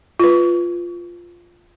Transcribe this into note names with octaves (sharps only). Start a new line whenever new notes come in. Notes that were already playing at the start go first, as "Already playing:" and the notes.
F4 B4